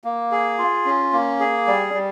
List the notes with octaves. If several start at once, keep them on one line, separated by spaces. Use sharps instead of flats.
A#3
G#4
F4
C#4
A#3
G#4
G3
G3